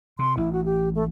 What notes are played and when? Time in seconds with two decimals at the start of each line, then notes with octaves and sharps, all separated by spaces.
0.19 C3 C6
0.37 A1 E4
0.53 F#4
0.65 G4
0.95 A3